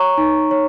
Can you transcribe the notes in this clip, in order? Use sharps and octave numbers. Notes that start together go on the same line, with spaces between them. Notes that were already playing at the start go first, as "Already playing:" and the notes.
Already playing: C#5 A#5 C#6
D#4
C#5